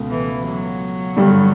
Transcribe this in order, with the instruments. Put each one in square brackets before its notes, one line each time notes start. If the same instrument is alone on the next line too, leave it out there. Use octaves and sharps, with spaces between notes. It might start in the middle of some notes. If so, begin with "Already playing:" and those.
Already playing: [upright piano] C#2 B2 A3
[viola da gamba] E3
F#3
[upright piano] G2 D3 G3 D4